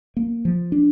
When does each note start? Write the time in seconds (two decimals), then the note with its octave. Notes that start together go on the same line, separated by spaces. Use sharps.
0.17 A#3
0.45 F3
0.72 D4